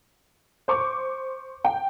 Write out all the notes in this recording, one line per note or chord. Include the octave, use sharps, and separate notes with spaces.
C5 C#6 D6
G5